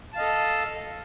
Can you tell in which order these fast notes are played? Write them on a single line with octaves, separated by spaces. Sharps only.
A5 F5 D#5 A4